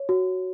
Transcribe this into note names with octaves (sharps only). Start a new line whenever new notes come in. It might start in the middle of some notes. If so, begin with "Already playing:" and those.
Already playing: C#5
F#4